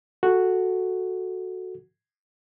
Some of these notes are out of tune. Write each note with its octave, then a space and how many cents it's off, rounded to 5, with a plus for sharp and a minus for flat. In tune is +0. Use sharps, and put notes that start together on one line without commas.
F#4 +0 A4 +0